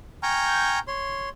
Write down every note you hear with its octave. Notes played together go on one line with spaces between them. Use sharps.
G5 G#5 A#5 C#6 F6 G6
C#5 C6